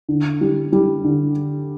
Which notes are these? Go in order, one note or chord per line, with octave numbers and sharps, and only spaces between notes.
D3
G3
G3
D3